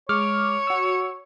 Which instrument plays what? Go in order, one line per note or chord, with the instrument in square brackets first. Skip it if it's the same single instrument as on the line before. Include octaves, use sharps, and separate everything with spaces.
[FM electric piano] G#3 D6 F6 [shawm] C#5
[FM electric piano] F#4 E6